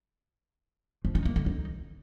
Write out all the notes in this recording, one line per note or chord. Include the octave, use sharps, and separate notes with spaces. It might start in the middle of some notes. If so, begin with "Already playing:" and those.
F3
D#4
A#3
D3
D#4